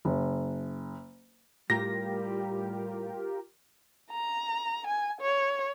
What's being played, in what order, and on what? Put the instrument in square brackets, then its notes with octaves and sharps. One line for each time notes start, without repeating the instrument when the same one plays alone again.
[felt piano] F#1
[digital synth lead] A2 [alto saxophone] G3 [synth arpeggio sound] F4 G4 A#4 [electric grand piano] A#6
[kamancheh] A#5
G#5
C#5